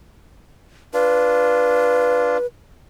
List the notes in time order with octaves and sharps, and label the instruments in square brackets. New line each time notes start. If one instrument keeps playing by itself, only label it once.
[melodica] D4 F4 [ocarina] B4